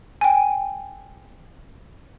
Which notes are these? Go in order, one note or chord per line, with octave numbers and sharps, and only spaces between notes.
G5 G#5